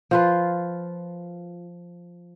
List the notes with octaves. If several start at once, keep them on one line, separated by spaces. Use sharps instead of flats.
F3 F4 B4